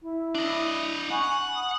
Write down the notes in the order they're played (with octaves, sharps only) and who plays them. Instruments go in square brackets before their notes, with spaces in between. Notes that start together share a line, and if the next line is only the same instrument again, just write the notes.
[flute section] E4
[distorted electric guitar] D4 D#5
[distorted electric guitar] F#5 [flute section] G#5 B5 C#6
[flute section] D#6